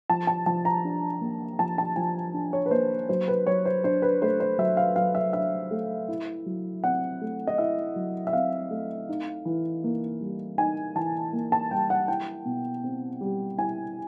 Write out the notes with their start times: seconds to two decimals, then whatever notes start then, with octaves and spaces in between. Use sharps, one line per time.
0.10 F3 A5
0.27 A5
0.46 F3 A5
0.65 A#5
0.85 D4
1.21 A#3
1.59 F3 A5
1.78 A5
1.96 F3 G#5
2.34 D4
2.53 C#5
2.66 B4
2.71 A#3 C5
3.09 F#3 C5
3.28 B4
3.47 F#3 C#5
3.65 C5
3.84 D4 C5
4.02 B4
4.22 A3 C5
4.40 C5
4.58 F#3 E5
4.77 F5
4.96 F#3 F5
5.15 E5
5.33 D4 E5
5.71 A3
6.08 E4
6.46 F#3
6.84 C4 F#5
7.21 A3
7.47 D#5
7.58 E4 E5
7.96 F#3
8.27 E5
8.33 C4 F5
8.71 A3
9.09 D#4
9.45 E3
9.84 A#3
10.21 G3
10.58 D#4 G#5
10.96 E3 A5
11.33 A#3
11.52 A5
11.71 G3 G5
11.90 F#5
12.08 E4 G5
12.45 B2
12.84 C4
13.21 G3
13.58 E4 G#5